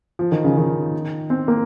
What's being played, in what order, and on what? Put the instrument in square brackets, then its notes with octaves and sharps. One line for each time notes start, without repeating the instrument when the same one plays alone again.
[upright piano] F3
D#3
C#3
D#3
C4
A#3